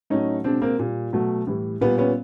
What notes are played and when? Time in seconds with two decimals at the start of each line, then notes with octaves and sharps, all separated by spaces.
0.10 A2 F#3 A3 C#4 D#4
0.44 B2 G#3 C4 D4
0.62 A#3 C4
0.79 A#2 G3
1.13 B2 F#3 A3
1.47 A2 E3 G3
1.81 A#2 G3 B3
1.98 B3 C#4